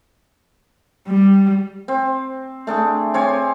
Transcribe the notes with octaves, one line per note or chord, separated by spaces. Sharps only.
G3
C4
A3 D4 G#4
C4 C#5 D5 G#5